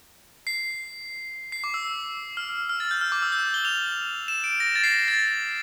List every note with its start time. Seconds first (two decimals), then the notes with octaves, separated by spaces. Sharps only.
0.47 C7
1.52 C7
1.64 D6
1.74 E6
2.37 F6
2.69 F6
2.80 A6
2.91 G6
3.01 F6
3.12 D6
3.23 E6
3.32 G6
3.54 G7
3.65 F7
4.28 E7
4.44 D7
4.60 A#6
4.76 A6
4.84 C7
4.92 A#6
5.08 A6